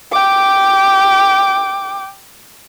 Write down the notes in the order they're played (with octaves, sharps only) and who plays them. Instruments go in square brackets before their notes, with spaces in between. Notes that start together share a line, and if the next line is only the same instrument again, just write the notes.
[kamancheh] G5 D6